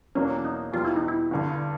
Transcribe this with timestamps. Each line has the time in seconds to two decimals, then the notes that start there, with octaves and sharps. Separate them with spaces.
0.15 E2 B2 F#3 A#3 C#4 D4
0.45 D#4
0.73 E2 B2 G3 F4
0.85 E4
0.96 D#4
1.08 E4
1.31 G1 G2 D3